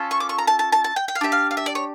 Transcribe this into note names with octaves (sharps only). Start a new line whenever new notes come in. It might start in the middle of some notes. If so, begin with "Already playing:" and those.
Already playing: C#4 F4 A4
C#6
D6
C#6
A#5
A5
A5
A5
A5
G5
G5
F5
D4 G4 E5
F5
F5
E5
D5
C#5